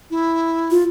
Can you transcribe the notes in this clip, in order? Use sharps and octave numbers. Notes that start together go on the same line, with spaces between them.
E4
F4